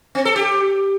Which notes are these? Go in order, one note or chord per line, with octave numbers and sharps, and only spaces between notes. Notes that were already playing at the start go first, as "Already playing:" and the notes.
C4
A4
G4